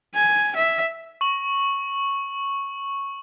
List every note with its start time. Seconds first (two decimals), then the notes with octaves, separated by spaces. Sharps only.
0.15 G#5
0.56 E5
1.21 C#6 F#7